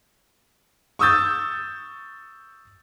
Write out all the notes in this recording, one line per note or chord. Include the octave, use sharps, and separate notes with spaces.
C#6 D#6 E6 G6 A6